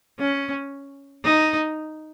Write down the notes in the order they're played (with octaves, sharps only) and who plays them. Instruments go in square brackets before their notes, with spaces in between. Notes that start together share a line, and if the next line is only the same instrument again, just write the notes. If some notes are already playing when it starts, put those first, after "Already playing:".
[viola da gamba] C#4
D#4